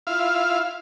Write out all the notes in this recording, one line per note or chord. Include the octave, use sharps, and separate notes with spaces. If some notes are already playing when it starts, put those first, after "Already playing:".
E4 F4 F5